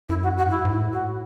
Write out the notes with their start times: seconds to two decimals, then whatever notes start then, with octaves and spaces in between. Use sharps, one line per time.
0.09 F#2 E4
0.23 F#4
0.37 F#4
0.44 G#2
0.50 F#2 E4
0.65 G#2
0.71 E4
0.79 A2
0.92 F#4